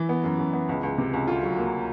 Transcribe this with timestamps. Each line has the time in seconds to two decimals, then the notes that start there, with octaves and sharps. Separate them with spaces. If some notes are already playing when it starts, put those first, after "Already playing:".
Already playing: E3 E4
0.09 B3
0.24 F#2
0.39 F#2
0.53 B3
0.69 C#2
0.83 C#2
0.98 C3
1.13 C#2
1.27 D2 F4
1.43 F#3
1.58 A#3